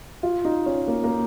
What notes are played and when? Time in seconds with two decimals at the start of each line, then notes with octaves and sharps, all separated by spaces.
0.23 F4
0.45 D#4
0.66 C#4
0.88 A#3
1.04 A#3